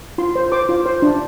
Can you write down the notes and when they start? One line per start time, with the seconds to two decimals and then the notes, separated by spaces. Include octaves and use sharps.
0.18 F4 C6
0.36 C5
0.52 C5 D6
0.69 F4
0.86 C5
1.02 D4